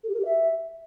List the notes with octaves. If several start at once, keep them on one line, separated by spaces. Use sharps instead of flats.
A4
G4
A#4
G4
E5